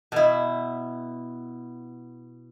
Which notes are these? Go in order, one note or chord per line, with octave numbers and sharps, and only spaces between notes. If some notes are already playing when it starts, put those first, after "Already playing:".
B2 E4